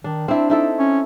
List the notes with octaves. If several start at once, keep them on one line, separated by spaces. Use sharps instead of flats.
D#3 D4
C4 D4 E4
D#4 E4 A4
C#4